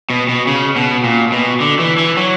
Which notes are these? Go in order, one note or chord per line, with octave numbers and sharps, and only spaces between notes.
B2
B2
C#3
B2
A#2
B2
D3
E3
E3
F#3